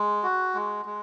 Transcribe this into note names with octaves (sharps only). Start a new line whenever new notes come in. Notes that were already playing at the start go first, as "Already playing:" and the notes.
Already playing: G#3
F#4
G#3
G#3